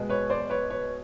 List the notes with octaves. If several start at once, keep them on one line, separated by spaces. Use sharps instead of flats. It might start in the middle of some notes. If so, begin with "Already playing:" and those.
Already playing: B2 G#3 B3
B4 C#5
C5 D5
B4 C#5
B4 C#5